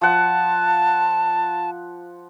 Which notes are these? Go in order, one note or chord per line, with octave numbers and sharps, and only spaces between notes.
F3 F#5 A5